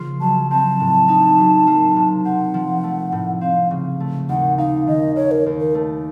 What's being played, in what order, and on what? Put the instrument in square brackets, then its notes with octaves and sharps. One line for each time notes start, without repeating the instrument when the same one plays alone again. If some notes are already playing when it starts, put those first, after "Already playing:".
Already playing: [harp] C#3 F3 A#3 F4
[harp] F#3 [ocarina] A5
[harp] C4 [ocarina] A5
[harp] A2
D#4
F#3
A#3
C3
[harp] C4 [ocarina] F#5
[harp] F3
A3
A2
[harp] C4 [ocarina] F5
[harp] C#3
A3
[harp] D#2 [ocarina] F#5
[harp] D#4 [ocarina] F5
[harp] D#3 [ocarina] D#5
[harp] A#3 [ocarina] C#5
[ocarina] A#4
[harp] D#2
[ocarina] A#4
[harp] A3